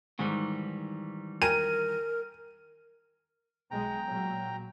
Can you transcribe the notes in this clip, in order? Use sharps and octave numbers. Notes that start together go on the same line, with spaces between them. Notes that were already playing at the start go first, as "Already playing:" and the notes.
G#2 D#3 E3 G3
A#4 G5 G#5 A#5 D#7
B1 G#3 G5 A#5
A#2 F#3